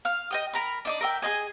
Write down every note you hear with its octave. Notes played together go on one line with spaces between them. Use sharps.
F5 F6
D#5 G5 D#6
A#4 A#5 B5
D4 D#4 D5
A#4 E5 G5
G#4 B4 D#5 G#5